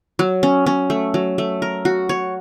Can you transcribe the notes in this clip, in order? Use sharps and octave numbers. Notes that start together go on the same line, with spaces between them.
F#3
C#4
C#4
A3
F#3
A3
A#4
F#4
C#5